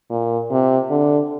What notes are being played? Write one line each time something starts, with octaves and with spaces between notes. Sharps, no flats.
A#2
C3
D3